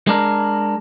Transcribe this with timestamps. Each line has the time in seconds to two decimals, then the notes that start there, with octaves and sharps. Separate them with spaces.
0.07 G#3 D4 A#4